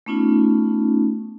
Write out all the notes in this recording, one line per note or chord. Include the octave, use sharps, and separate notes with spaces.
A3 B3 C#4 D#4 F4